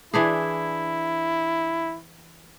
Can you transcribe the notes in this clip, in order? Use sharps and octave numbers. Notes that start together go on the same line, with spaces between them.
E3 D4 E4 G#4